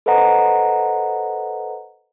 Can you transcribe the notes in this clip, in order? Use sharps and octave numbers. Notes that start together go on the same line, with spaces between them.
A4 B4 C5 D#5 F#5 A#5